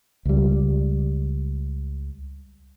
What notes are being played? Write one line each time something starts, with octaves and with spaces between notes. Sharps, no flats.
C#2 G3